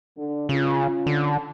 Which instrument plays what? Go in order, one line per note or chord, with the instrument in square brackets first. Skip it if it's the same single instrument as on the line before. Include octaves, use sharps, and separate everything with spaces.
[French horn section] D3
[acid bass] C#3 [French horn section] C#4 F4
[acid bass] D3